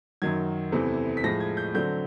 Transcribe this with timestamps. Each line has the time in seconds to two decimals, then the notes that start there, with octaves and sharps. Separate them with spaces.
0.22 F#2 D#3 F#3 G#6
0.72 E2 C3 E3 A3 C4
1.17 B6
1.24 A2 F3 G#3 A#6
1.40 G#6
1.57 G6
1.74 D3 F#3 A3 C4 G6